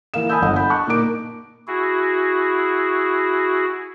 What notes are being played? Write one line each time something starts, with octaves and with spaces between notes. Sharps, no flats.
E3 A#3 A#4 F5 E7
G#5 A5 B5 D#6 E6 G6
G1 D#5 F#5 D#6
B5 G6
A5 C#6 F#6
A#2 A#3 D#4 A#4 D6 D7
E4 F#4 G#4